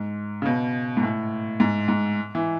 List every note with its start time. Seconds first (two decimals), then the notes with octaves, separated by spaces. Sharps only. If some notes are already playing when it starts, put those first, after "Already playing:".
Already playing: G#2
0.42 C#3
0.46 B2
0.97 G#2
1.03 A2
1.60 G#2
1.88 G#2
2.35 E3